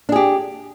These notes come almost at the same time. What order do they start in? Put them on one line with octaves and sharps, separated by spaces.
D4 G#4 G4